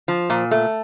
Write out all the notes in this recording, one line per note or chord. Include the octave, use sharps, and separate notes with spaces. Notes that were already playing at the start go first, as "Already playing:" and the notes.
F3
A#2
A3